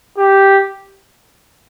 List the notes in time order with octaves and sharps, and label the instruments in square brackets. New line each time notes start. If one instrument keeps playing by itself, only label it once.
[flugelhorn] G4